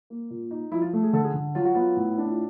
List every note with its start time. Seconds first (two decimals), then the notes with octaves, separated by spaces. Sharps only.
0.10 A#3
0.30 A#2
0.51 D#4
0.71 F3 E4
0.82 F4
0.93 A3
1.03 G#4
1.13 D3 A4
1.24 G#4
1.34 D3
1.55 F#3 F4
1.65 F#4
1.74 B3 F4
1.97 A2
2.18 D4
2.26 F4